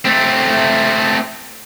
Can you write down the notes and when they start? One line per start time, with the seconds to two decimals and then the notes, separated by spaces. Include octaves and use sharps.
0.05 A3 C4